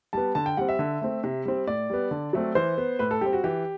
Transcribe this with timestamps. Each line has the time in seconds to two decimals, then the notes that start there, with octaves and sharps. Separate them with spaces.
0.13 G3 B3 A5
0.35 D3 A5
0.46 G5
0.57 G3 C4 F#5
0.69 E5
0.79 D3
1.02 A3 C4
1.24 C3
1.45 G3 C4
1.67 A2 D5
1.90 G3 B3
2.11 D3
2.33 F#3 A3 C4
2.55 E3 C5
2.78 B3
2.99 A2 B4
3.11 A4
3.21 G3 C4 G4
3.33 F#4
3.44 E3 G4